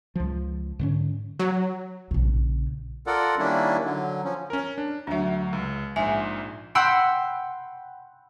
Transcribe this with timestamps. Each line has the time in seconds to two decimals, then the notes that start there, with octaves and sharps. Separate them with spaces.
0.15 C#2 F3
0.79 G#2 D3 C#4
1.40 F#3
2.11 A#1 C#3
3.07 F4 A4 A#4 D5 F#5
3.38 D#3 G3 A#3 C#4 D4 E4
3.85 D3 F#3
4.24 F3 C#4
4.50 C#4 A#4
4.78 D4
5.07 D2 F#3 D4 E5
5.53 C#2 G#3
5.96 A#1 G#2 E5 G#5
6.75 F#5 G5 B5 C6 E6